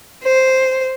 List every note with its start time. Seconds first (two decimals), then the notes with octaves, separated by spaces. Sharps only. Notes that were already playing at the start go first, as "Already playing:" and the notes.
0.24 C5